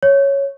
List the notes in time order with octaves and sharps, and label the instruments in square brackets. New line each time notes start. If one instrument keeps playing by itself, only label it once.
[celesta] C#5